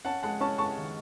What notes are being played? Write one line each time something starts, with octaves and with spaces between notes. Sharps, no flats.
C#4 F#5 A5
G#3 F#5 A5
C#4 A5 C#6
G#3 A5 C#6
D#3